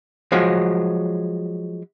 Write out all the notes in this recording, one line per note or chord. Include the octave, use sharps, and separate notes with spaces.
F3 F#3 G#3 F#4